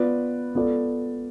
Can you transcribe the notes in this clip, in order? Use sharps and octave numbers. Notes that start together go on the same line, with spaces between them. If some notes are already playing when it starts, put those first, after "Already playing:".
Already playing: B3 F4 B4 D5
B3 F4 A4 D5